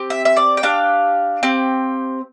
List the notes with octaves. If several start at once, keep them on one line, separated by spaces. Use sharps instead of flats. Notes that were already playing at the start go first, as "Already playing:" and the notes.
Already playing: C4 G4
E5
E5
D5
G5
D4 G4 F5
C4 G4